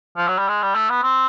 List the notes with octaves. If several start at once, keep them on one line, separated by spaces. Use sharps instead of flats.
F3
F#3
G3
G#3
G3
A3
B3
C4